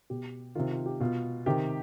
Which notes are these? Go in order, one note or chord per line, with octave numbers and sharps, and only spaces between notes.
B2 G4
C3 D#3 F4
F4
G4
B2 F4
C3 D#3 G4